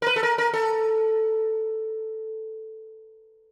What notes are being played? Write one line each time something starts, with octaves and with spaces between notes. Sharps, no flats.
A#4
B4
A4
A#4
A#4
A4